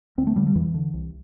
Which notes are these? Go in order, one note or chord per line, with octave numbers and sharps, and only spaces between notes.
D2 C4
A3
D3 G3
G3
E2 E3
D3
C2